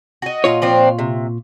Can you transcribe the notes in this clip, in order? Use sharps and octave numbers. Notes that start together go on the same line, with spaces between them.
F#4 D#5
A#2 F4 C#5
F3 C4 D4
C3